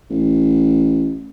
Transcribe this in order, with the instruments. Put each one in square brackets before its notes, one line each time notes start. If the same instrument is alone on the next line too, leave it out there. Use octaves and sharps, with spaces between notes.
[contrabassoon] A1